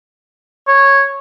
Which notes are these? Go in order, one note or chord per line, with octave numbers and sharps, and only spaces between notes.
C#5